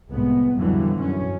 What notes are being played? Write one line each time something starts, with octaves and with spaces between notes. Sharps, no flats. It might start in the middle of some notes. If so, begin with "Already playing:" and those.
C2 A2 G#3 B3
F2 B2 D3 E3 F#3 G3
F#2 C#4